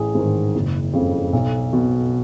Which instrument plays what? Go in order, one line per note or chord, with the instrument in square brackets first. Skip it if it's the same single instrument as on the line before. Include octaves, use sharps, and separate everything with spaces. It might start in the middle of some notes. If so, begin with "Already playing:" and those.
Already playing: [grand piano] A1 G#4
G#2 D#3
F#1
F2 C#3
B1
B2